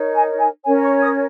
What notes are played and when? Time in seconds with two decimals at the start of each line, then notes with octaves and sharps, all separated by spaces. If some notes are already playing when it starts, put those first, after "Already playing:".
Already playing: D#4 A#4 C#5
0.14 G#5
0.39 G#5
0.64 C#4 A#4 C#5 G#5
0.83 C#6
1.02 D#6